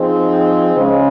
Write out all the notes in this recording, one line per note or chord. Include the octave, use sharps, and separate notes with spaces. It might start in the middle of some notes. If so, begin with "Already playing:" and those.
Already playing: F3 C4 D#4 G#4
C#3 G#3 C#4